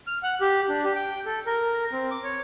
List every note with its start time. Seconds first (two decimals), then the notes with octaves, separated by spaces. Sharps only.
0.07 F6
0.23 F#5
0.41 G4
0.69 D4
0.84 G4
0.95 G5
1.26 A4
1.46 A#4
1.92 C4
2.11 D6
2.24 C#5